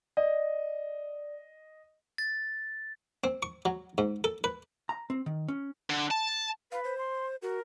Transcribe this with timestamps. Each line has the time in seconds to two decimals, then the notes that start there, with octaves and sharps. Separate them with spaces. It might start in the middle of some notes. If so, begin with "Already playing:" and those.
0.17 D5 D#5
2.18 A6
3.24 C4
3.43 C#6
3.65 F#3
3.98 G#2
4.24 A4
4.44 B4
4.89 A#5
5.10 C4
5.26 D#3
5.48 C#4
5.90 D3
6.11 A5
6.72 B4 F5
6.84 C5
6.98 C6
7.42 F#4 A#4